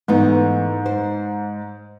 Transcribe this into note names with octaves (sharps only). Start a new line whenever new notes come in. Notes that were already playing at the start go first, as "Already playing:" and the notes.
G#2 E3 A3 B3
C5